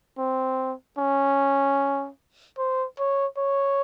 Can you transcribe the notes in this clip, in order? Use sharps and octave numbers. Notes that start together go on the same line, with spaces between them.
C4
C#4
C5
C#5
C#5